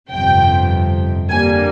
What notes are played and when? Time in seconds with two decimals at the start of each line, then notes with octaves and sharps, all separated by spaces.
0.10 G1 F2 C3 G5
1.29 F2 D3 G3 A#3 G#5